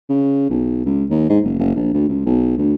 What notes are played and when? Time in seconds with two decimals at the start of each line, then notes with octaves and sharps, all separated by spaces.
0.09 C#3
0.50 B1
0.86 C#2
1.10 D#2
1.29 G#2
1.44 F#1
1.59 F#1
1.76 A#1
1.94 D2
2.08 C#2
2.26 B1
2.57 D2